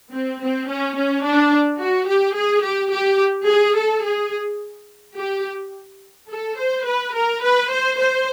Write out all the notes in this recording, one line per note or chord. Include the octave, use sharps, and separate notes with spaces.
C4
C4
C#4
C#4
D4
F#4
G4
G#4
G4
G4
G#4
A4
G#4
G4
A4
C5
B4
A#4
B4
C5
C5